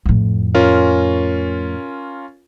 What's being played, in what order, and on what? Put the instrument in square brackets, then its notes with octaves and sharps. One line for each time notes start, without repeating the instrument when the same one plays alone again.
[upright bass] F2 A2
[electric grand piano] C#4 F4 A#4